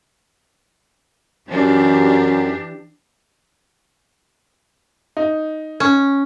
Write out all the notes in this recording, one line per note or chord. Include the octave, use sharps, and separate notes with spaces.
F#2 E3 D4 G4
D#4
C#4